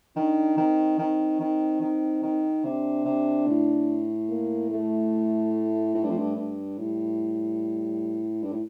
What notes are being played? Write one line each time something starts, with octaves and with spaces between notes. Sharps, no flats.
D#3 D4
D#3 C4
D#3 C4
D#3
D#3
D#3
C3 D4
C3
A2
A#3
A3
A2
G2
F2
G2
G2
A2 G3
G2
A2